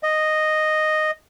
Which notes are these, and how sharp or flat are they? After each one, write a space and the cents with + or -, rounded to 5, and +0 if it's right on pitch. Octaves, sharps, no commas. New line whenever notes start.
D#5 -5